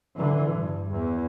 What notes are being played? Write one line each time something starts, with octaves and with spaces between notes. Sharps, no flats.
D3 E3
G2
E2